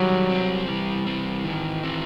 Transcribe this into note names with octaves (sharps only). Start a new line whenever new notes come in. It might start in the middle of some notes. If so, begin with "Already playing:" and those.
Already playing: D#3 F#3 G3
C4
E3 G3
C4
D#3
C4